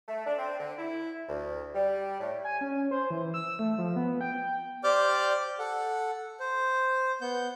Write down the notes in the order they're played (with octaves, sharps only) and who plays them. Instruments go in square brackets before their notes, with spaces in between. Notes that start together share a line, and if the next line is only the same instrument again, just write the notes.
[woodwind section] A3
D4
C4
D3
E4
D2
G3
A2
[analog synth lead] G#5
C#4
C5
E3
E6
A3
F3
B3
G5
[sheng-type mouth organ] G4 C5 D5 D6 F6 G6
A4 F#5
C5
B3 G6